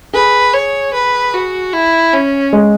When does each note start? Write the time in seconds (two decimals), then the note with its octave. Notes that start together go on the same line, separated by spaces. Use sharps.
0.13 G#4 B4
0.54 C#5
0.94 B4
1.34 F#4
1.73 E4
2.13 C#4
2.53 G#3